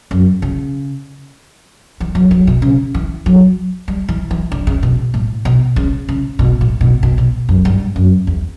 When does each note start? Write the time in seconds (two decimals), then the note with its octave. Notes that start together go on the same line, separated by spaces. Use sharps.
0.11 F#2
0.42 C#3
2.00 E3
2.15 F#3
2.31 F#3
2.47 B2
2.62 C#3
2.94 E3
3.26 F#3
3.88 G3
4.09 E3
4.31 E3
4.52 D3
4.67 C#3
4.83 B2
5.14 A2
5.45 B2
5.76 C#3
6.09 C#3
6.39 B2
6.61 A2
6.81 B2
7.03 B2
7.18 B2
7.49 F#2
7.65 G2
7.96 F#2
8.27 E2